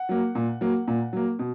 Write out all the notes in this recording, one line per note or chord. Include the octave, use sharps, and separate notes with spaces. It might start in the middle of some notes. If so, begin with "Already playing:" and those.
Already playing: F#5
F#3 A#3
A#2
F#3 A#3
A#2
F#3 A#3
B2